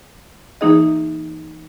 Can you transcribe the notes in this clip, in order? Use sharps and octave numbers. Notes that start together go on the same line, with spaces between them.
E3 A#3 D#4 G#4 D#5